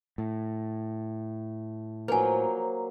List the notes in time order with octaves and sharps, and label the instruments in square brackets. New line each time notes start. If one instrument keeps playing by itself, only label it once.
[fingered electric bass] A2
[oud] F3 [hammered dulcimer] F#3 A#3 [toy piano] B4 G#5